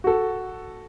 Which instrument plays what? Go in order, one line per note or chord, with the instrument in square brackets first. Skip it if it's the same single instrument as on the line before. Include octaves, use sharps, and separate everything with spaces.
[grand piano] F#4 A4